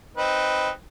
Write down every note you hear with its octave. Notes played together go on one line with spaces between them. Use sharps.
C4 D#4 B4